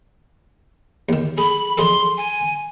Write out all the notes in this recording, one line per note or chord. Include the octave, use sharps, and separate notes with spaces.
D#2 D#3
G#4 B5
F2 G#4 A4 C6
G#5